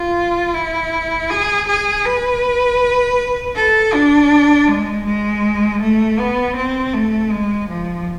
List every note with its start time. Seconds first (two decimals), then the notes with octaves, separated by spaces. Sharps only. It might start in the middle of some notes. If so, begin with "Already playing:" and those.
Already playing: F4
0.54 E4
1.30 G#4
1.68 G#4
2.05 B4
3.56 A4
3.93 D4
4.68 G#3
5.05 G#3
5.82 A3
6.19 B3
6.56 C4
6.94 A3
7.32 G#3
7.69 F3